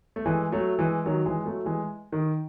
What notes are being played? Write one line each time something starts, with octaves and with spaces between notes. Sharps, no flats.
A3
E3 G#3
F#3 A3
E3 G#3
D#3 F#3
E3 G#3
F#3 A3
E3 G#3
D#3